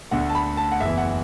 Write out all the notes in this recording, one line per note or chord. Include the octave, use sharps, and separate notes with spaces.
D2 D3 A3 F#5
A5
B5
A5
F#5
F#1 E2 E3 E5
F#5